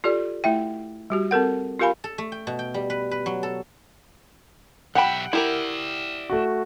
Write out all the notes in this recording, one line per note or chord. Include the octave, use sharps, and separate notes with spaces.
F4 G4 A4 D5
A3 E4 E5 G5
G3 F#4 G4
C4 A4 A#4 F#5
F4 G4 A#4 F5 G#5 B5
A4
A3
G5
B2
G5
G3
B4
B4
F#3
A4
B1 G4 E5 F#5 G5 B5
E4 G4 A#4 D5 E5
A3 F#4